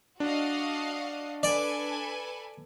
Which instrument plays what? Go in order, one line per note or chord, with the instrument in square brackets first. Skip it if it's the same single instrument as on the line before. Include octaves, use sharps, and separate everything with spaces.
[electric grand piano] D4 [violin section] F#4 D#5 F5
[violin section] A4 B4 G#5 [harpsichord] D5